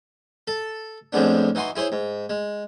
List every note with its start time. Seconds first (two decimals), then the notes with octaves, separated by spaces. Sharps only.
0.47 A4 A5
1.13 F2 A2 F3 G#3 B3 D4
1.55 E3 D#4 F#4 G#5 C6
1.76 E4 G#4 C5 C#5
1.92 G#2
2.29 G#3